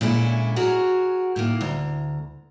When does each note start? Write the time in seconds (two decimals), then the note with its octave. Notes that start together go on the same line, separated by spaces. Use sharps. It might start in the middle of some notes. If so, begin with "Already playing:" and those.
0.01 A#2 D3 G#3 C#4 E4
0.56 F#4 G#4 A#4 C#5
1.36 A2 D#3 A#3
1.61 D2 A#5